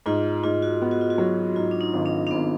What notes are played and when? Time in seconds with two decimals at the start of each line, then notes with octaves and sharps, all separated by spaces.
0.06 G#2 F4
0.44 G#2 F4
0.62 F#4
0.82 B3
0.91 F#4
1.01 F4
1.10 F#4
1.18 F#3
1.56 G#2 F4
1.71 D4
1.81 D#4
1.93 G#1
2.06 D4
2.27 D4
2.31 G#1 B3